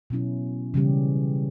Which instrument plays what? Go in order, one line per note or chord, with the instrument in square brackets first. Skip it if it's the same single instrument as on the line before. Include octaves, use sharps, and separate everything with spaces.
[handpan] B2 F#3 C#4 E4
C#3 E3 G3 C#4 G4